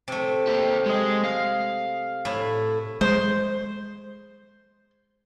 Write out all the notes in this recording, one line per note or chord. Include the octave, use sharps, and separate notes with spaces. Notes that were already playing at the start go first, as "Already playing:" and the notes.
C3 A3
A#3 G4
G#3 D#5
F5
A2 E4
G#3 C5